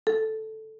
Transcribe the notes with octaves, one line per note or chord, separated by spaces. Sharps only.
A4